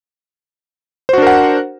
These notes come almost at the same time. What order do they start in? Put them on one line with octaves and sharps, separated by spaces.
C5 F#4 D4 A#4 F#5